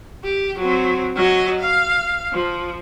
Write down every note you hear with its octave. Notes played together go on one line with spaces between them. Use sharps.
G4
F#3 C4
F#3 D#5
F5
F3